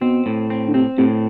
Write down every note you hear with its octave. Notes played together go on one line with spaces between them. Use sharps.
B2 C4
A2
C4
D3
C3 C4
A2 C3